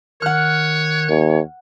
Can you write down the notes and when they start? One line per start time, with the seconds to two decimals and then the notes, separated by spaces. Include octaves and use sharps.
0.22 D#3 C#5 F#5 F6 F#6
1.09 D#2